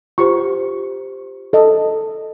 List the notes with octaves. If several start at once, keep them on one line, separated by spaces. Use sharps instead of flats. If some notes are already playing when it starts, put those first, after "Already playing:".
F4 G4 C5 C#6
A4 D#5